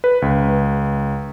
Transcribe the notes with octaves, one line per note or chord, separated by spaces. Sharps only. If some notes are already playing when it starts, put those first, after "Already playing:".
B4
C#2